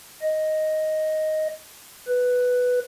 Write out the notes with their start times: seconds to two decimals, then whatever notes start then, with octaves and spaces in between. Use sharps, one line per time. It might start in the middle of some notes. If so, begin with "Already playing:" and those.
0.22 D#5
2.08 B4